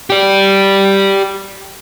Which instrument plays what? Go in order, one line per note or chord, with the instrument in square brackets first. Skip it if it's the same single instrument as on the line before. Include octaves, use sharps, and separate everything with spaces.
[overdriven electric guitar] G4 D5